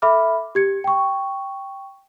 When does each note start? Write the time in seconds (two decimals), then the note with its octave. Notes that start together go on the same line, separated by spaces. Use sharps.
0.02 A4 E5 B5 D6 F6
0.55 G4 G#6 C#7
0.84 G5 C#6